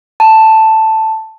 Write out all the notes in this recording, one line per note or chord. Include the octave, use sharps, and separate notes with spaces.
A5